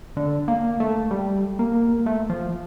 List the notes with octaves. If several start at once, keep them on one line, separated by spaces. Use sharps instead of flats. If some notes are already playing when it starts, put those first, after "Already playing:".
D3
A#3
A3
G3
A#3
A3
F3